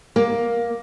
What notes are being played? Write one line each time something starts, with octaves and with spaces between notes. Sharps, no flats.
A#3